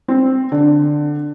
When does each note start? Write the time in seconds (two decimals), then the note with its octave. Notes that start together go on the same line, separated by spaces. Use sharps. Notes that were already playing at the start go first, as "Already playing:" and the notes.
0.08 C4
0.52 D3